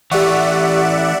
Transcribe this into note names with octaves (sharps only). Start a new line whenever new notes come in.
E3 A3 G4 D5 E5 F#5 C#6